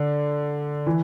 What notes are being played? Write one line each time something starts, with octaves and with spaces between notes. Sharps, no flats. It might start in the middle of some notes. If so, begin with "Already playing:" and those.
Already playing: D3
E3